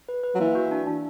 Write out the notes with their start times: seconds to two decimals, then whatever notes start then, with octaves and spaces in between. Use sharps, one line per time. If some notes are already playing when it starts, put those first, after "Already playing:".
0.09 B4
0.24 B4
0.35 F#3
0.39 E3 A#3
0.55 F#4
0.71 D4
0.87 D4